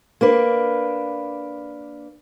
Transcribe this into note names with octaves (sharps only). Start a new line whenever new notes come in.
A#3 D4 B4